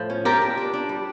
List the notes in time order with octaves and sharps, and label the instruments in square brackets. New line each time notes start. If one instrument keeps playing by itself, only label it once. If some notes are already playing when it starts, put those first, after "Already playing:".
Already playing: [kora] A2 F3
C#4
F4 G4 A#4
D4
D4
D4
G3